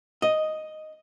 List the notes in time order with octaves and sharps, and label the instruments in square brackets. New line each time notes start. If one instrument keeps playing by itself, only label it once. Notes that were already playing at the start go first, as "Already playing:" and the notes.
[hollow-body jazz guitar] D#5